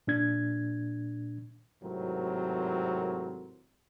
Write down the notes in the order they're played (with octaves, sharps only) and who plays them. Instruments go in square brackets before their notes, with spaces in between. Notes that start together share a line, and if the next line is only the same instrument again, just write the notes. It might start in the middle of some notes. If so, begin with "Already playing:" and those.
[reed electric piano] A#2 D4 G#6
[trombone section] G#1 A2 C3 F#3 C4 A#4